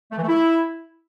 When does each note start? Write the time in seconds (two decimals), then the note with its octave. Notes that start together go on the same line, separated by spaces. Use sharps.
0.12 A3
0.17 E3
0.23 A3
0.28 E4